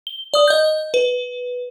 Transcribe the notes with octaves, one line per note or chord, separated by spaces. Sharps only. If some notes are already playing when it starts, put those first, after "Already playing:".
G7
D5 D#6
D#5 G6
B4